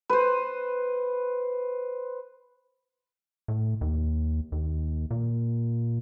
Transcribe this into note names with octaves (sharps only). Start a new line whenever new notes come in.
B4 C5
A2
D#2
D#2
A#2